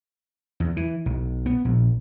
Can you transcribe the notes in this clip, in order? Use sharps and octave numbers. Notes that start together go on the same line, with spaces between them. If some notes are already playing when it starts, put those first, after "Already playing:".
E2
E3
B1
B3
A#1